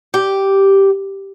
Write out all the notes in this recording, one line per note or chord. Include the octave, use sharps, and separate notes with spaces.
G4